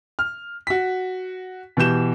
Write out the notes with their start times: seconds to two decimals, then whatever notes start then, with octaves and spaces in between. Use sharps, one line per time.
0.19 F6
0.67 F#4 B6
1.77 B2 E3 G4 G6 E7